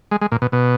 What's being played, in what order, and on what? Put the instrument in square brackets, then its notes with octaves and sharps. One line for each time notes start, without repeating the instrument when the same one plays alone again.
[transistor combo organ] G#3
G#3
A#2
B2
B2